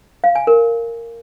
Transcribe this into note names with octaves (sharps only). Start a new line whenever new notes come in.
F5
G#5
A#4